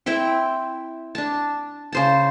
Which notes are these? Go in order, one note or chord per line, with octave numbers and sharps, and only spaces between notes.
C4 E4 E5 G5
D4 A5
C#3 C5 A5